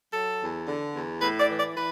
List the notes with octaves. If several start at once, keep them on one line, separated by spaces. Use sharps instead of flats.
F#3 A4
E2
D3
E2
A2 B4
D5
E3
D5
E3 B4